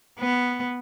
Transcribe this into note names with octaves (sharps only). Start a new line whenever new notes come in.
B3